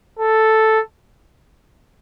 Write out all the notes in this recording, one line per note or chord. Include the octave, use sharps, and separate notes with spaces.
A4